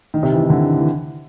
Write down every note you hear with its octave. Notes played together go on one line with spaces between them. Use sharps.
D#3
C3
E3
D#3
D3
E3